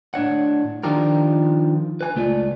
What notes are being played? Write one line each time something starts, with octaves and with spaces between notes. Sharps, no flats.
A2 D4 C#5 F#5
D#3 F3 D4 F4 G4 A#4
B4 G#5
C#2 A3 F4 D5